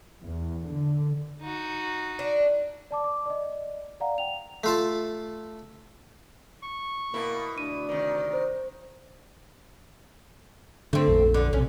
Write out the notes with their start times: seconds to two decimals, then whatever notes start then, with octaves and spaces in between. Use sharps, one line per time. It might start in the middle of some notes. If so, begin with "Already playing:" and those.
0.22 E2
0.68 D3
1.41 D#4 F#4
2.19 D4
2.91 D5 A5 D6
3.04 D6
3.26 D5 D#5
4.00 D5 F5 F#5 A#5
4.18 G5 F7
4.64 A3 F4 A5
6.63 C#6
7.14 B2 A#3 E4
7.58 D2 D4 D#7
7.89 C3 D#3 D5
8.33 C5
10.93 D3 A3 C4
11.08 A#1 F2
11.34 E2 D3
11.53 B1 C3 C#4